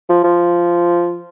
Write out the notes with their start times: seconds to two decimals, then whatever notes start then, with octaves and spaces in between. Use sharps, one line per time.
0.09 F3
0.24 F3